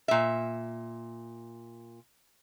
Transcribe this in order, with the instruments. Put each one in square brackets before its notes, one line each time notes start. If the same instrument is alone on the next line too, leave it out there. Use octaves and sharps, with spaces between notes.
[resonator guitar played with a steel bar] A#2 E5